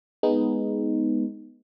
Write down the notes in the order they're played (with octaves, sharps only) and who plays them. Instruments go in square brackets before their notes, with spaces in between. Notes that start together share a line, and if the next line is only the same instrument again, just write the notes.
[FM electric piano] G#3 B3 D#4